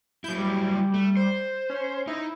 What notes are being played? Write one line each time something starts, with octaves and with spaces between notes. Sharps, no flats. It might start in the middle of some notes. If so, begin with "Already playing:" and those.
F#3 E4 G6
G3
A3
C5
C#4
D#4 E4